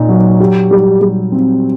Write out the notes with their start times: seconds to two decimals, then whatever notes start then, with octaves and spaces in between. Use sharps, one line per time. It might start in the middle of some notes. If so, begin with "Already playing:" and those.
Already playing: A#2 D#4
0.09 F#3
0.40 G4
0.71 G3
1.01 G3
1.32 C4